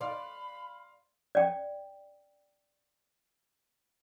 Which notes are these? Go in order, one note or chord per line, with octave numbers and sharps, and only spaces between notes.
D5 F5 B5 C6
D5 G5